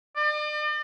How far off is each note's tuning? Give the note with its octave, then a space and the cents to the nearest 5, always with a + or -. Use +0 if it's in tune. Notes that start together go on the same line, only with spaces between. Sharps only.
D5 +45